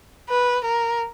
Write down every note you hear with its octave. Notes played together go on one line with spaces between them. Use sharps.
B4
A#4